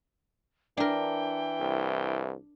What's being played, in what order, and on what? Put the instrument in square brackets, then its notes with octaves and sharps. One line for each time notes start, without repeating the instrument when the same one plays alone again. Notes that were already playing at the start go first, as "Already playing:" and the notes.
[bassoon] E3 [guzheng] D4 A#4 [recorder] G5
[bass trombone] C2